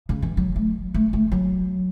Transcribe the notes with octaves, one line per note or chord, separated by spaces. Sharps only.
C#3
E3
F#3
A3
A3
A3
F#3